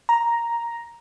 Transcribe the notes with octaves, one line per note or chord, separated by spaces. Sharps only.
A#5